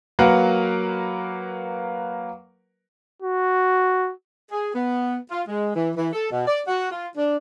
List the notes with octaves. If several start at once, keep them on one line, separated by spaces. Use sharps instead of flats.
F#3 A#3 A#4 B4 F#5
F#4
G#4
B3
F4
G#3
E3
E3
A4
B2
D5
F#4
F4
D4